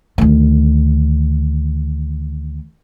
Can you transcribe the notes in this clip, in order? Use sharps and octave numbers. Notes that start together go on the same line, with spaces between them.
D2 D#3